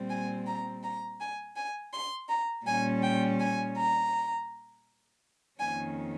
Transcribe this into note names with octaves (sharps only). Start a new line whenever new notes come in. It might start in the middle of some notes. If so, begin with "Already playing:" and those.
Already playing: A#2 G3 C4
G#5
A#5
A#5
G#5
G#5
C6
A#5
A#2 G3 C#4 G#5
G5
G#5
A#5
F2 D#3 A#3 C#4 G#5